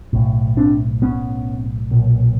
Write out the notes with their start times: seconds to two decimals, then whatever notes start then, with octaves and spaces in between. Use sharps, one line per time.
0.13 B1 A2
0.57 C4 D4
1.02 B3 C#4
1.91 B1 A#2